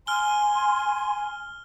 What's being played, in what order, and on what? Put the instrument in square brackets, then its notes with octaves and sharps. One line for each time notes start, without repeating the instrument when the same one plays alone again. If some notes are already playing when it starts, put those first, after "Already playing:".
[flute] G#5 [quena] C6 [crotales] F6 G7